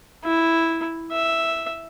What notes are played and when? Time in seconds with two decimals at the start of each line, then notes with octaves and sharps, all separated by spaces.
0.25 E4
1.12 E5